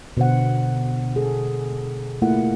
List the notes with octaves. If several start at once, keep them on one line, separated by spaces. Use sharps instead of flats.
B2 D3 C5 F#5
G#4 A4
A3 A#3 E4 F4 F#5